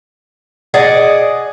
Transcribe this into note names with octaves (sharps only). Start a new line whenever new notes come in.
G#4 D5 D#5 F#5